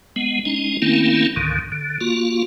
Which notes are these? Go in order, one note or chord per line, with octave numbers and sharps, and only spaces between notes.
G#3 B3
G#3 C#4 D#4
D#3 A3 A#3 C4 C#4 E4
C#2 G#2 D3 D#3
D3
A#3 F4 F#4